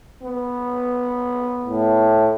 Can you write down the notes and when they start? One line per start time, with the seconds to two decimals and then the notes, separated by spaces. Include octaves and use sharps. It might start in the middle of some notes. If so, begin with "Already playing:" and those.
0.22 B3
1.65 A2